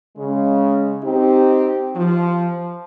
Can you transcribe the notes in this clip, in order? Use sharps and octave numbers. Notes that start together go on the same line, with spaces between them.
C#3 G#3
C4 D#4 G4
F3